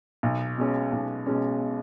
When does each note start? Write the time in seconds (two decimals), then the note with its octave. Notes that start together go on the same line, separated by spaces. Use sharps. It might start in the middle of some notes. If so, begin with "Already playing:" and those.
0.23 B1
0.57 B2 G#3 C#4
0.92 B1
1.26 B2 G#3 C#4